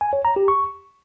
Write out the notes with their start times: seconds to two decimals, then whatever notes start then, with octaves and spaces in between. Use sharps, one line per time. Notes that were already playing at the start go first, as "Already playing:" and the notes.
0.01 G#5
0.13 C#5
0.25 A#5
0.36 G4
0.48 C#6